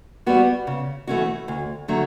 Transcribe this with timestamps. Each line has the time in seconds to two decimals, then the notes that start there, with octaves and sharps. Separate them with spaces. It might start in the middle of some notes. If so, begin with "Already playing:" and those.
0.26 G3 B3 F#4
0.67 C#3
1.07 E3 A3 C#4 F#4
1.48 D2
1.88 D3 F#3 A3